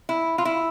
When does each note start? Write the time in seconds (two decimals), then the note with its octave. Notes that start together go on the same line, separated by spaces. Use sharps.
0.09 E4
0.38 F4
0.45 E4